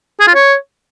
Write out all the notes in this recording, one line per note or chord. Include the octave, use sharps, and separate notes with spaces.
G#4
F4
C#5